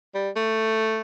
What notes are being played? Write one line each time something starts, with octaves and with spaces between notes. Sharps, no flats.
G3
A3